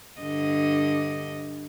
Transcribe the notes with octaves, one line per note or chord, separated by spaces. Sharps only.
G2 D3 D#5